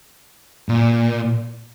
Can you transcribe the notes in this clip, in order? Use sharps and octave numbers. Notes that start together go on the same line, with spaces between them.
A#2